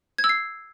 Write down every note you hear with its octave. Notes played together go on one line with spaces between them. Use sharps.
G#6
E6
C7